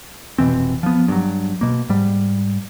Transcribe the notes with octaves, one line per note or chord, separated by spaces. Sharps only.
F1 B2 E3 C4
F3 B3
G2 F#3
B2 A#3
G#2 G3